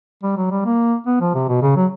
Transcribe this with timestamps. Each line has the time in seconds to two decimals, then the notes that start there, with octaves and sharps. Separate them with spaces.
0.23 G3
0.37 F#3
0.51 G3
0.65 A#3
1.07 B3
1.21 F3
1.34 C3
1.48 B2
1.62 C#3
1.76 F#3